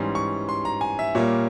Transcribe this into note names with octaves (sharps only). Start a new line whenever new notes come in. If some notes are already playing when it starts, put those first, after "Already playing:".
Already playing: G#2 E3 G3 C#4 C6
C#6
C6
A#5
G#5
E5
A#2 G3 A#3 C#5